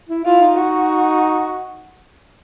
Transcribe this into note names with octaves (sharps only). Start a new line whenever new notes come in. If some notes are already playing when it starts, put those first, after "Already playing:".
E4
E4 F4
D#4
F#4